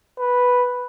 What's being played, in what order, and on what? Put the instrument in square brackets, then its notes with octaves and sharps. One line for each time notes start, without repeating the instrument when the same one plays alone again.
[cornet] B4